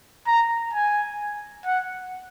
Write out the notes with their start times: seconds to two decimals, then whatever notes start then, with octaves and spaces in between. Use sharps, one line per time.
0.27 A#5
0.73 G#5
1.66 F#5